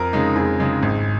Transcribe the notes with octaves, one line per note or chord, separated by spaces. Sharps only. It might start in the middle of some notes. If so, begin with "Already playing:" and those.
Already playing: F2 A#4
C#3 G#3 D#4
F2 G#4
C#3 G#3 D#4
G#1